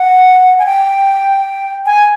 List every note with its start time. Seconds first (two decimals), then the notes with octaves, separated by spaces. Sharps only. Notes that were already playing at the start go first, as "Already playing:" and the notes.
Already playing: F#5
0.59 G#5
0.66 G5
1.86 G#5